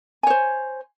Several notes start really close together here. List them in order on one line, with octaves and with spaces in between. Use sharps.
G#5 C#5 C5